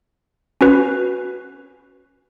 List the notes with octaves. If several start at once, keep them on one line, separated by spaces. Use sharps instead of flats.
C#4 F#4 B4